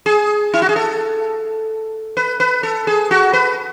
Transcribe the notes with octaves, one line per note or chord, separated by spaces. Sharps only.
G#4
E4
F#4
G#4
A4
B4
B4
A4
G#4
F#4
B4